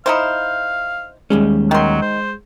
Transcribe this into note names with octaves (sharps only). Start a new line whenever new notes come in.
D#4 E4 C5 F5
D#2 G3 G#3 C#4
D#3 F#3 C6
C5